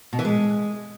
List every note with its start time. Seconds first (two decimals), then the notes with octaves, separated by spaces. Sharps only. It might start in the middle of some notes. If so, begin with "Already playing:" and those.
0.13 B2
0.19 E3
0.25 G#3